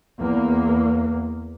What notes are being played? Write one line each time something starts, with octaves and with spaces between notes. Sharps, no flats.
E2 A#3